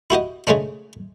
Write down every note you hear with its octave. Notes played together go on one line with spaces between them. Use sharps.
E4 F#4 G4 D#5
C#3 G#3 A3 C#4 D4